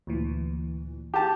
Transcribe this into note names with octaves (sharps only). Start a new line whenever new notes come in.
D2 A#2 E3
G4 A5